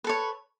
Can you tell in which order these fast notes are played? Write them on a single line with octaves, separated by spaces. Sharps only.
B4 A4 C#5